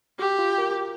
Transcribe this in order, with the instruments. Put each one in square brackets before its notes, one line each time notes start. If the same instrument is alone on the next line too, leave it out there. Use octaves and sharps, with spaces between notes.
[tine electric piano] F#4 [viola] G4
[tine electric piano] F4
A#4